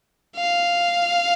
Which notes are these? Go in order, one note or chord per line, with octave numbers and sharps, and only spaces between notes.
F5